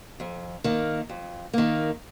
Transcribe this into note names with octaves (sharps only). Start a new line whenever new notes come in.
F2
D#3 A#3
F2
D#3 A#3